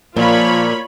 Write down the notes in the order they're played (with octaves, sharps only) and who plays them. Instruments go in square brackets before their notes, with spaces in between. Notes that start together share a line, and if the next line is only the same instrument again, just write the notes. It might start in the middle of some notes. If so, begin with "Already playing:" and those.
[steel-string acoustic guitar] A#2 [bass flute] F3 [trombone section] A#3 [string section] F4 C#5 B5